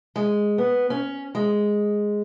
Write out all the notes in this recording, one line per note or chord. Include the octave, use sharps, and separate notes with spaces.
G#3
B3
C#4
G#3